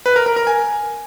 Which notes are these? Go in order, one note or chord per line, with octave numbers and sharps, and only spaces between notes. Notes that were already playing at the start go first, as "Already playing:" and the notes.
B4
A#4
A#4
A#4
G#5